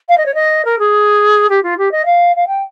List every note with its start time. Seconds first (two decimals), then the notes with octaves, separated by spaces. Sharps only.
0.09 F5
0.18 D#5
0.26 C#5
0.35 D#5
0.65 A#4
0.79 G#4
1.50 G4
1.63 F4
1.78 G4
1.92 D#5
2.05 F5
2.36 F5
2.47 G5